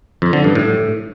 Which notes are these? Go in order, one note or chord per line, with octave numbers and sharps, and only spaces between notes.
F2
D3
G2
A2